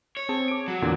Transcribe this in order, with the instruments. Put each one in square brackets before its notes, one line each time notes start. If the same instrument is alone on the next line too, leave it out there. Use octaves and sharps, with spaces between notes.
[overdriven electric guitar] C#5
[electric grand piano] C4 G#4 A5
D6 D7
[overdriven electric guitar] F#3
[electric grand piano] E2 A#2 D3